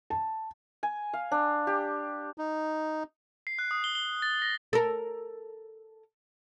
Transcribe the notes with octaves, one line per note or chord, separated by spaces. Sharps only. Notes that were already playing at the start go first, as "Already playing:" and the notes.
A5
G#5
F5
D4
G4
D#4
C7
F#6
D#6
G7
G7
A6
A#6
A4 A#4